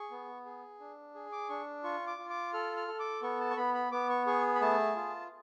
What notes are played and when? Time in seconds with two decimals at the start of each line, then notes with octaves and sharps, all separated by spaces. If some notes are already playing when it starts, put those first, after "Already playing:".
Already playing: G#4 C#6
0.11 B3
0.45 G#4
0.80 D4
1.14 G#4
1.32 D6
1.49 D4 C#6
1.84 F4 C#6
2.07 D6
2.18 F4
2.30 D6
2.53 A4 F6
2.76 F6
2.88 A4
2.99 D6
3.22 B3 C#6
3.40 A5
3.51 C#6
3.57 B3 B5
3.74 B5
3.92 B3 D6
4.09 C#6
4.27 G#4 C#6
4.55 B5
4.61 A3 A5
4.96 F4